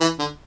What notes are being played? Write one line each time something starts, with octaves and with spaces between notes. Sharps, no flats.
E3
D3